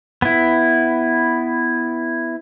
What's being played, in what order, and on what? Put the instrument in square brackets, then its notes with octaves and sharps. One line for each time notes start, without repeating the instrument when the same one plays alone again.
[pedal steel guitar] B3 E4